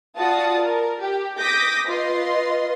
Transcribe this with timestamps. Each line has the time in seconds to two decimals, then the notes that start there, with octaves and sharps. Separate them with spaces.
0.17 F4 F#4 D5 A5 D#6
0.60 A#4
1.00 G4
1.39 D6 D#6 G6 A#6 B6
1.87 F4 B4 D#5 C6